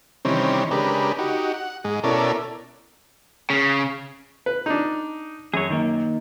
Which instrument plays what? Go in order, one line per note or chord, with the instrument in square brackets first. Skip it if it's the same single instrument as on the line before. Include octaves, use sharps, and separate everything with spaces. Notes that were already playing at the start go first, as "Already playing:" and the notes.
[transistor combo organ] C3 D#3 E3 G3 C4 C#4
C#3 G#3 D4 G4 A#4 B4
D#4 F#4 G4
F#5
G#2 G#3
B2 C#4 E4 A4 A#4 D5
[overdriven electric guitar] C#3
[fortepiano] B4
D4 D#4
[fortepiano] F#2 [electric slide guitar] G#4 C#5
[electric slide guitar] D#3 A#3